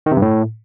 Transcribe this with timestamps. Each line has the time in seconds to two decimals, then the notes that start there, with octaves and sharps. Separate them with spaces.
0.06 D#3
0.11 C3
0.17 G2
0.22 A2